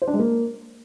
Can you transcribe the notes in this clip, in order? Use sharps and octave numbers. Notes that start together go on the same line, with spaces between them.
C5
D4
G#3
A#3